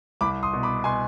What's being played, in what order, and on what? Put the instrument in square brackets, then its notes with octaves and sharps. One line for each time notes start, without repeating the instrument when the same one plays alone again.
[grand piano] C2 B5 D6
C6 D#6
B2
B5 D6
B2 G#5 C6